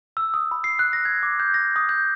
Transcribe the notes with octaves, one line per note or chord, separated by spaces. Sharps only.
E6
D#6
B5
C7
F#6
A#6
G#6
D6
G6
A#6
D#6
G6